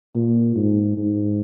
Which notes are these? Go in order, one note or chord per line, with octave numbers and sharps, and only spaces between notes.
A#2
G#2
G#2